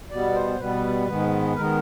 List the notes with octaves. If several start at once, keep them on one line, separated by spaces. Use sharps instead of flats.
B2 G3 B3 D5
C5
B2 G3 B3 B4
G#2 D#3 G#3 B3
D#3 G#3 B3 A#4